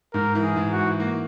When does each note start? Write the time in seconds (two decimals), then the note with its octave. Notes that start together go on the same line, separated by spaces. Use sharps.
0.14 G#2 A#4
0.35 E3
0.43 G#4
0.56 G#2
0.71 F#4
0.78 E3
1.00 A#3